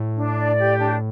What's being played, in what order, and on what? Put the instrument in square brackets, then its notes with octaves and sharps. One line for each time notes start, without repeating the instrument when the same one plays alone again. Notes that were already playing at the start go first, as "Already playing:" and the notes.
Already playing: [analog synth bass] A2
[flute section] D4
D5
G4
D4